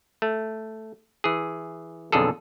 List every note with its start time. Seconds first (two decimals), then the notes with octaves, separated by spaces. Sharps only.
0.22 A3
1.24 E3 G#4
2.12 B1 F2 D3 G#4 A4